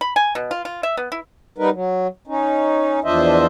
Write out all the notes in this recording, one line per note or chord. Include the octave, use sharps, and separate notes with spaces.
B5
G#5
B2
F4
F4
E5
B3
E4
G3 B3 D#4 A#4 B4
F#3
C#4 D#4
E2 F3 D4 C5 D#5 E5